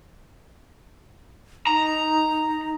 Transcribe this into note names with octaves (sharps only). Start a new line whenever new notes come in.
D#4 A#5